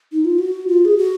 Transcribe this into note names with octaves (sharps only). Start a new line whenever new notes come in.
D#4
F4
F#4
F4
G#4
F#4